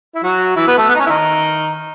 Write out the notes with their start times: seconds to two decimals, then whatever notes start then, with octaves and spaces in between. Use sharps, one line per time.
0.15 E4
0.23 F#3 F#4
0.56 E3 E4
0.67 B3 B4
0.78 A3 A4
0.89 B3
0.95 D#4
1.00 C#4
1.06 E4
1.10 D#3 D#4